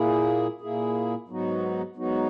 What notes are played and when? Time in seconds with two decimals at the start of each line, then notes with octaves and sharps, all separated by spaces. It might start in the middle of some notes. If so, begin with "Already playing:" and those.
Already playing: A#2 A#3 E4 G#4
0.61 A#2 A#3 E4 G#4
1.28 G#2 F#3 B3 D#4 F#4
1.96 G#2 F#3 B3 D#4 F#4